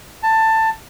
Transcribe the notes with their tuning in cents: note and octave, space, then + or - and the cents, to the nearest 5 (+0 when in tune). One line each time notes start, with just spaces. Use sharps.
A5 +15